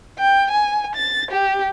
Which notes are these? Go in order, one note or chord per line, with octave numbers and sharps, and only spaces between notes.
G5
G#5
A6
G4